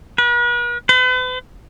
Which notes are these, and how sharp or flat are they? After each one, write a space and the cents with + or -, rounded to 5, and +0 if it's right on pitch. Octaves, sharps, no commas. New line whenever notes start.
B4 -45
B4 +40